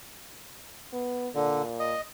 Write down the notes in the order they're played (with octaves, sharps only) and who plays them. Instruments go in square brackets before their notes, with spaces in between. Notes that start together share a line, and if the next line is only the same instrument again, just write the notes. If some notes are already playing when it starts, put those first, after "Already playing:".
[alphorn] B3
[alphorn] A#2 [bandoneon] D3
[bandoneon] D#5